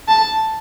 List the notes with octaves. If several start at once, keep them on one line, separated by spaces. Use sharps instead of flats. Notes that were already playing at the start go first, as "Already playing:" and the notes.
A5